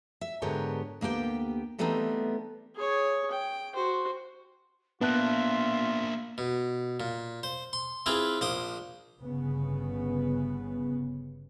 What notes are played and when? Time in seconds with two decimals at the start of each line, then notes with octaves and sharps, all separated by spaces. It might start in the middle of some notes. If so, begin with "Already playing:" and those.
0.21 E5
0.42 G#2 D3 B3 G4 A#4 C#5
1.01 D2 A#3 B3 G4 G5
1.78 E3 G3 A3 B3 C4 D#4
2.75 G#4 C#5
3.31 G5
3.75 F#4 C5
5.01 A#3 B3 D4 F4 E5 A5 F#6
6.38 B2
7.00 A#2
7.43 C5
7.73 C6
8.06 C4 E4 F4 G#4 B4
8.41 A#1 C5 D6 D#6
9.19 G1 C#3 B3